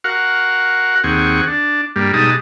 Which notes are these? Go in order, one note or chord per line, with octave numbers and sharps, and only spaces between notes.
F#4 A#4 F5 F#5
D#2 C4 G#4 F#5 C#6
D4
G2 G3 A#3
B2 G3 G#3 D#4 A5 D#6